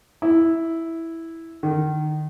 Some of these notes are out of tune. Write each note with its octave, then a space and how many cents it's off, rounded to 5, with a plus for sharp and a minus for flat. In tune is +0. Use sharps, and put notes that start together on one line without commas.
E4 -5
D#3 -30